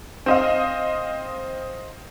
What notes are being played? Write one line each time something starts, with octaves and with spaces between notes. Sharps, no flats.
C4 D#5 F5